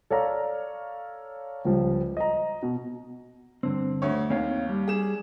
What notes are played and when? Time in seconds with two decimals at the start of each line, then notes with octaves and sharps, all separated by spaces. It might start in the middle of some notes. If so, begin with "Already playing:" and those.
0.10 A4 C#5 D5 F5 A#5
1.65 C#2 F3 G3
2.17 D#5 A#5
2.62 B2
3.63 G2 D3 C4
4.02 D2 C#5
4.30 D#2 C4 C#5 F5
4.69 G3
4.88 G#4 E7